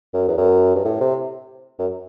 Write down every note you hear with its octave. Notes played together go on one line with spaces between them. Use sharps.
F#2
E2
F#2
G2
A2
C3
F#2